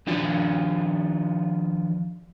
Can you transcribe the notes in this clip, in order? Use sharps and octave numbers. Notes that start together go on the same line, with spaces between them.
D#3 F3 D4 F4 F#4